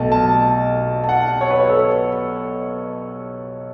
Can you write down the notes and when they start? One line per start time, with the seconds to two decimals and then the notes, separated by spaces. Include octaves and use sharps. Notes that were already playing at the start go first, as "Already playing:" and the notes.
Already playing: B1 B2 A3 A5
0.12 A5
1.04 A5
1.09 F#5
1.41 C#5
1.50 B4
1.60 C#5
1.69 A4
1.74 B4